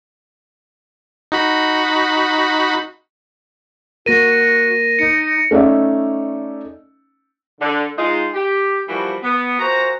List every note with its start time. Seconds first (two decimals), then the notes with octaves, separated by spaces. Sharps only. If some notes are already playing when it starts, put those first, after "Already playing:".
1.32 D#4 F#4 B5
4.06 A#3 F#4 A#4 A#6 D#7
4.99 D#4 C#7
5.51 A3 C#4 D#4 D5 E5
7.60 D3
7.97 G#3 D#4 F4
8.34 G4
8.88 E3 F3 G3 A#3 F#4
9.23 B3
9.60 A#2 F#4 C5 A#5